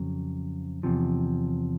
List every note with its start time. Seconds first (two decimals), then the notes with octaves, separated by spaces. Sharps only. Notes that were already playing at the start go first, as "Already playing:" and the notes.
Already playing: F2 C#3 F#3
0.83 E2 C3 F3